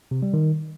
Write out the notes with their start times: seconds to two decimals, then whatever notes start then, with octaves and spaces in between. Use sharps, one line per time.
0.11 C3
0.22 G3
0.34 D#3